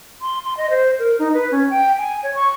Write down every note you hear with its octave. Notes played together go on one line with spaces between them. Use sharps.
C6
C6
D#5
C5
A#4
D#4
B4
C#4
G5
G#5
C#5
C#6